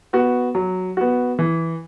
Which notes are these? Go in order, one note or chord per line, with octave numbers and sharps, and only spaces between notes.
B3 F#4
F#3
B3 F#4
E3